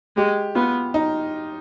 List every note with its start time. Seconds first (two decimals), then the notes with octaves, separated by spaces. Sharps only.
0.16 G#3 G4
0.55 B3 F4
0.94 D#4